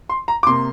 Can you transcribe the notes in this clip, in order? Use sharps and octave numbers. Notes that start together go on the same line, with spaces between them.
C6
A#5
D6
C3 A#3 C6